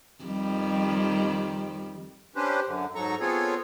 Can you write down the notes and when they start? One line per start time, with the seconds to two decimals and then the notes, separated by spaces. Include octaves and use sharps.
0.24 F2 D#3 G3
2.36 C#4 D4 G4 B4 C5
2.67 F#2 D3
2.95 G#2 F#3 A4 A#5 C#6
3.20 B3 C4 F4 G#4 A4 C#5